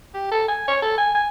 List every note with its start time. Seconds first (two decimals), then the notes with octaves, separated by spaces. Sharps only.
0.14 G4
0.31 A4
0.48 G#5
0.68 C#5
0.82 A4
0.98 G#5
1.15 G#5